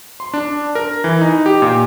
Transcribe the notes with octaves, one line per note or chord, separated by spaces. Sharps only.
C6
D4
A#4
E3
D#4
G4
A#2